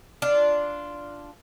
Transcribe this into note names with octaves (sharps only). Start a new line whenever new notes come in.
D4 F4